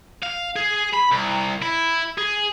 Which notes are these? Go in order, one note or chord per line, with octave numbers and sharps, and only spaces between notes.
F5
G#4
B5
C2
E4
G#4